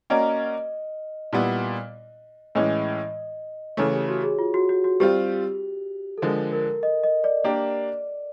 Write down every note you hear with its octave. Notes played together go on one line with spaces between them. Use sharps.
A#3 C#4 F#4 A#4 D5 D#5
A#2 G3 B3 E4
A2 E3 G#3 C#4 D#5
C#3 E3 A3 C#5
G4
F#4
G#4
F4
F#4
F#4
F#4
G3 C4 F4 G4
A4
D3 F3 G#3 A#4
A#4
D#5
D#5
D5
A#3 D4 G4 D5